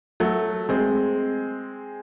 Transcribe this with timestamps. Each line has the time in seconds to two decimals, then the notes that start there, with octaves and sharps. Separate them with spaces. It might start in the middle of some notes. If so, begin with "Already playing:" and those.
0.20 F#3 A3
0.69 G#3 C4